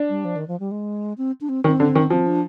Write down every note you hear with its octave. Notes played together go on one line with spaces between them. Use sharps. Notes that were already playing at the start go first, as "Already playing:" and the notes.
Already playing: D4
G3
F3
D#3
F3
G3
G#3
C4
D4
C4
D#3 C4
D3
D#3
F3 C4
D4